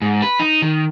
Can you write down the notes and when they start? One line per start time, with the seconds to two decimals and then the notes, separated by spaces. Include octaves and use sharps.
0.02 G#2
0.22 B4
0.40 D#4
0.62 D#3